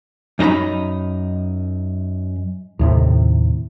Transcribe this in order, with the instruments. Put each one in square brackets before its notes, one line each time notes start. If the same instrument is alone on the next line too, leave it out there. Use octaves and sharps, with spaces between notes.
[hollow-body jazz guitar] F#2 D#4 G4 A#5 B5
[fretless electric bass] D#2 A2 C3